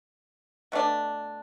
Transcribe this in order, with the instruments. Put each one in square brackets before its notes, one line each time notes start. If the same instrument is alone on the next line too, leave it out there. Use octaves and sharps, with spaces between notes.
[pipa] B2 A3 D4